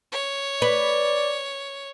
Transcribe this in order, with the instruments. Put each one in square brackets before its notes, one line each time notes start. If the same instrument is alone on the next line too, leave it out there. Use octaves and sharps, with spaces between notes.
[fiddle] C#5
[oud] B4 [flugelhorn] D5